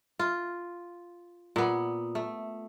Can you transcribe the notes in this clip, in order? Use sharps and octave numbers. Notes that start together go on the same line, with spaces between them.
F4
A#2 B3
A3